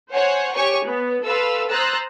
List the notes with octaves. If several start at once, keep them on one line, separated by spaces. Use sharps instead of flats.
C5 C#5 F#5 G#5
G4 C#5 G#5 C#6
B3
A4 B4 F5 C6 E6
C5 A#5 D#6 E6 F#6 A6